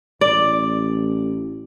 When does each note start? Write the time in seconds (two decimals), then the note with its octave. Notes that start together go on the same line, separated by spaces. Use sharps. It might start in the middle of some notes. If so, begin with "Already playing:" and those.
0.21 A1 D5